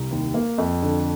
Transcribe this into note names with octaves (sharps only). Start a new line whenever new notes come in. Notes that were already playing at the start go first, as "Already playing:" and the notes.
Already playing: C2
D#2
A#3
F2
D3